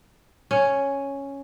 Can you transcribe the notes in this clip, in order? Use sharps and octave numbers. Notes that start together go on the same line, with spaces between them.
C#4